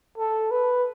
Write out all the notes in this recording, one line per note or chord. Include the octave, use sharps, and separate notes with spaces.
A4
B4